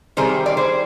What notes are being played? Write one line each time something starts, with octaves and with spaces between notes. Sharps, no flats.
C3 D#3 G3 G#4 C5
D5
G#4 C5